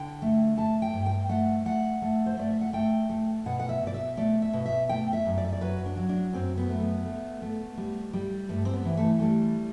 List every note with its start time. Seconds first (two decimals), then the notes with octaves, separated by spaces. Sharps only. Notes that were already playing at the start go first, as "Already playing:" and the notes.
Already playing: D3 G5
0.22 A3
0.57 A3 A5
0.82 G5
0.93 G2
1.06 G5
1.29 A3 F#5
1.65 A3 F#5
2.02 A3
2.26 C5
2.37 A3 D5
2.51 E5
2.61 F#5
2.73 A3 G5
3.09 A3
3.46 B2 F#5
3.60 F#5
3.69 E5
3.82 B2
3.87 D5
3.94 E5
4.17 A3 D5
4.42 E5
4.53 B2
4.66 E5
4.89 A3 G5
5.13 E5
5.26 F#2
5.38 D5
5.45 E5
5.53 D5
5.61 F#3 B4
5.86 D4
5.97 F#3
6.09 D4
6.33 F#2 C4
6.58 B3
6.69 A3
6.82 B3
7.06 A3
7.42 A3
7.77 G3
8.13 G3
8.49 G2 A3
8.65 C4
8.73 B3
8.85 E3
8.97 A3
9.20 G3 A3